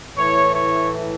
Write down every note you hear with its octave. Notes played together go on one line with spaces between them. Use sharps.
A2 E3 A3 C#5
C#5